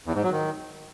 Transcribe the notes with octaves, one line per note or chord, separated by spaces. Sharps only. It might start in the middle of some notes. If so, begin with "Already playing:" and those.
E2
G#2
F#3
D#3